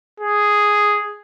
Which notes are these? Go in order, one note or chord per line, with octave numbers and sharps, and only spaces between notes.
G#4